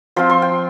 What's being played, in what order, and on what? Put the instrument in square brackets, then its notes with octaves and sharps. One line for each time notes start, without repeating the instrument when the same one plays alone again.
[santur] F3 C4 F4 C6
C6
G5